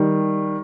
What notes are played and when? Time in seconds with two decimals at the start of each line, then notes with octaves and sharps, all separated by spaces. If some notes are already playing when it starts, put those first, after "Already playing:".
Already playing: D#3 G3